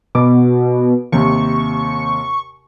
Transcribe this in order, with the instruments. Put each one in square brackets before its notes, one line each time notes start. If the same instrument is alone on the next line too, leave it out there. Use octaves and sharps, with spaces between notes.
[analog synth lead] B2 [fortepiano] D6
[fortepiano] D#2 C3 [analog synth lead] C#6